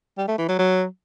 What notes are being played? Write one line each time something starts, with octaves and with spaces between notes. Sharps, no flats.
G3
A3
E3
F#3
F#3